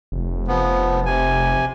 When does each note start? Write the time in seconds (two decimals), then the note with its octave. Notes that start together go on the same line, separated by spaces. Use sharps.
0.12 F1
0.47 F3 B3
1.06 C3 G#5